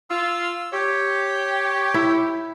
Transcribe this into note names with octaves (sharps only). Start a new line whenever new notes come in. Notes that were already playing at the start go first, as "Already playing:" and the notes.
F4 E6
G4 C#5
E4